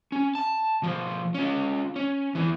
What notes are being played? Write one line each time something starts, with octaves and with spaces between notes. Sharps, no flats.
C#4
A5
B2 F3
C#4 F4
C#4
E2 E3